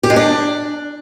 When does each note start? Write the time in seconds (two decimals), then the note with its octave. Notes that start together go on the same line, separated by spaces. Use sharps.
0.03 G4
0.10 G#3
0.16 D4